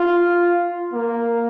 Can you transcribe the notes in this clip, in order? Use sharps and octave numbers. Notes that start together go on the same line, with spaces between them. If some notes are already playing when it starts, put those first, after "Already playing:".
Already playing: F4
A#3